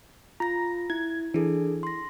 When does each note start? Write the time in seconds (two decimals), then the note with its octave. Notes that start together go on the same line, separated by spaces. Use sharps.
0.40 F4 A#5 A#6
0.90 E4 G#6
1.34 E3 D4 G#4 A4
1.83 C6 A#6